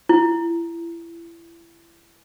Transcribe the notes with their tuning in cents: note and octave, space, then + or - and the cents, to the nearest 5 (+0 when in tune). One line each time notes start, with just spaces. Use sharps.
E4 +30